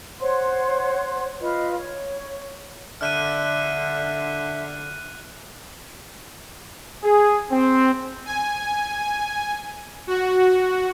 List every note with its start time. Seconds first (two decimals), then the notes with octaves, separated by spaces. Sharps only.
0.20 C5 C#5 F#5 C6
1.41 F4 B4 D#5
1.76 C#5
3.01 D3 E5 F6 F#6 D#7
7.03 G#4
7.51 C4
8.25 G#5
10.07 F#4